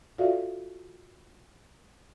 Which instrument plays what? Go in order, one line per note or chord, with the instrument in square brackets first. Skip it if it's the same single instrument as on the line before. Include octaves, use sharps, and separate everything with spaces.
[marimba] F4 F#4 A4 D5 E5 F5